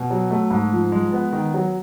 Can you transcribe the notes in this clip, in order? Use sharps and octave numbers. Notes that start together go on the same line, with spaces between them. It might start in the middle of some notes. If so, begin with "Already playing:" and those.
Already playing: B2
F#3
A3
G#2
F3
G#3
B3
D#3
F#3